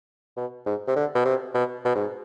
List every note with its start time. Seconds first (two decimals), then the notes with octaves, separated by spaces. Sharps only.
0.37 B2
0.66 G#2
0.88 C3
0.96 D3
1.15 B2
1.25 C3
1.55 B2
1.85 B2
1.95 G#2